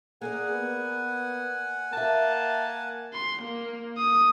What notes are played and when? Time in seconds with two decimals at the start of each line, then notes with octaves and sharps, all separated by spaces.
0.22 A#3 G#4 A#4 D5 F#5 G#5
0.52 B3
1.93 A#3 A#4 E5 A5
3.14 C6
3.42 A#3
3.98 D#6